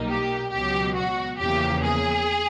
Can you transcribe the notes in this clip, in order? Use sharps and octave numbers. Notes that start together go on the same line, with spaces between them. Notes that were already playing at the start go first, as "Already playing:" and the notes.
Already playing: B1 A#2 G3 A#3 D#4
G4
C#2 B2 F#3 G4
F#4
E2 C#3 F3 A#3 G4
G#4